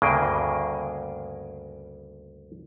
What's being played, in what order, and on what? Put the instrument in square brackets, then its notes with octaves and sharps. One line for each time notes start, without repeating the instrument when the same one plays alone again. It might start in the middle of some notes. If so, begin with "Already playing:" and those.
[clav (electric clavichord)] D2 G2 C#3 A#3 G#4 G5